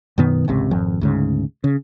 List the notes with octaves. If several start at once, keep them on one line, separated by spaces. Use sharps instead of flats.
F#2 B2 D#3 B3
G#1 C#2 C3
G#1 F2
D2 G#2 C#3
C#3